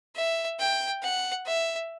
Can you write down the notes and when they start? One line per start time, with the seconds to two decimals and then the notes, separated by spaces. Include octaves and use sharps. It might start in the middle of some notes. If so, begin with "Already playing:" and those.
0.16 E5
0.59 G5
1.03 F#5
1.46 E5